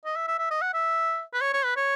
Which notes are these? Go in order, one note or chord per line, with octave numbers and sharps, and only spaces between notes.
D#5
E5
E5
E5
D#5
F#5
E5
B4
C#5
C#5
B4
C#5